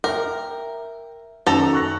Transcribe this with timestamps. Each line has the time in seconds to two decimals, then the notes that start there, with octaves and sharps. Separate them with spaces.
0.04 A#4 E5 G5
1.47 F#2 D#3 F#4 A4 A#5
1.73 C#6 F#6 A#6